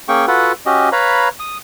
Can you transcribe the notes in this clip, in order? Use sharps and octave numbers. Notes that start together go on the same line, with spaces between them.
A#3 C#4 G#4 G5 C#6
F4 F#4 A4 B4 F#5
C#4 F#4 G4 D#5
B4 C#5 F5 A#5 B5
D#6